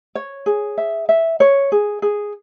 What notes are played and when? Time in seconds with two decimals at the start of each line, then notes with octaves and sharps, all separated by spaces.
0.15 C#5
0.46 G#4
0.78 E5
1.09 E5
1.40 C#5
1.72 G#4
2.02 G#4